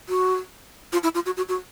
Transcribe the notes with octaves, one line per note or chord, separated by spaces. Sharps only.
F#4
F4
E4
F4
F#4
F#4
F#4